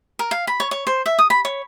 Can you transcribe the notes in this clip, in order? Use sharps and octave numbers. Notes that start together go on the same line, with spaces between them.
A#4
F5
B5
C#5
C#5
C5
E5
D#6
B5
C#5